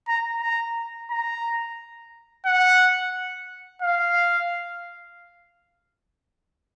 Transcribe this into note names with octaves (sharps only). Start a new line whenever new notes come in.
A#5
A#5
A#5
F#5
F5